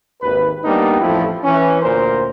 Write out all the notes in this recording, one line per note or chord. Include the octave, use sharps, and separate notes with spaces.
G#1 D#2 B4
G3 A#3 B3 D4 D#4
A1 F2 F3 A3 E4
E3 C#4
D2 A#2 A#4 C5